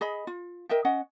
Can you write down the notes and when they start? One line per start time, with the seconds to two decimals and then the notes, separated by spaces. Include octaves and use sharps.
0.01 G#4 D#5 B5
0.27 F4
0.69 A#4 D#5 E5 G5
0.85 C#4 D#5 F#5